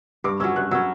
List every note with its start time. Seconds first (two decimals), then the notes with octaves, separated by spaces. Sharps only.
0.24 G2 D6
0.40 F#3 C#4 E6
0.56 G2 F#6
0.71 F#3 C#4 E6